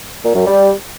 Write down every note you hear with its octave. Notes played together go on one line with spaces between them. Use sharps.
A#2
F#2
G3